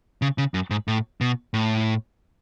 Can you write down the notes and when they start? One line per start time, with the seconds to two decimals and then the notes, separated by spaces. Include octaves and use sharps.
0.22 C#3
0.38 C#3
0.54 F#2
0.71 G#2
0.88 A2
1.21 B2
1.54 A2